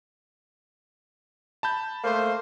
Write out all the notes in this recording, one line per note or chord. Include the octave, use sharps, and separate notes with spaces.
A5 B5 G6
A3 A#3 C5